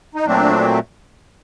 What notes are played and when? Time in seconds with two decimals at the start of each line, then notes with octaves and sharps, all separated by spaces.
0.15 D#4
0.26 A#2 F#3 A3 C4 D4